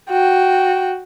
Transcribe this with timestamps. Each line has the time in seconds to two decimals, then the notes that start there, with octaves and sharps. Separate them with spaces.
0.10 F#4 G5